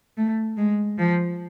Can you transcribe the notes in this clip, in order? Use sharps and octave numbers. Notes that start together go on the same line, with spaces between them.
A3
G#3
F3